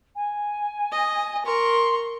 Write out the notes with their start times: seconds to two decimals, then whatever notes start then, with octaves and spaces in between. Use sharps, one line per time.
0.15 G#5
0.92 D#5
1.46 A#4 C6 C#6